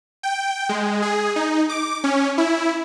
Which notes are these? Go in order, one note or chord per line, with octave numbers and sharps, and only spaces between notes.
G5
G#3
G#4
D#4
D6
C#4
E4